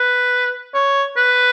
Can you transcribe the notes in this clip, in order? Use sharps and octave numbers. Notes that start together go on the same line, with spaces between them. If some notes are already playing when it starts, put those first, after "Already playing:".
Already playing: B4
C#5
B4